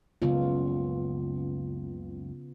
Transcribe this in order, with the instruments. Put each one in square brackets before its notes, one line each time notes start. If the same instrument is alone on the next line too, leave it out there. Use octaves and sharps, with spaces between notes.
[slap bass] F#1 C#2 [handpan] C#3 B3 F4